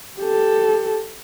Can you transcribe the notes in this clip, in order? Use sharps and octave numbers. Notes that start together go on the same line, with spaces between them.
G4 A4